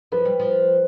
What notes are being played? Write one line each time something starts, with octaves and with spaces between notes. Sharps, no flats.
F3 B4
G3
F3